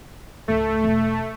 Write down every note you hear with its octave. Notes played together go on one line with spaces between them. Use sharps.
C#2 G#2 A3
E1